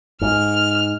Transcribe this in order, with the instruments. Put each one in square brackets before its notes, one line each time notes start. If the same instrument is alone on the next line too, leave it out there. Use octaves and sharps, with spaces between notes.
[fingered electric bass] G#2 [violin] F6